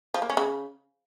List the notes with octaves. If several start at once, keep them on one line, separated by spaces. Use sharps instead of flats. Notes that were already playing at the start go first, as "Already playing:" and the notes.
F3
A#3
C#4
C#3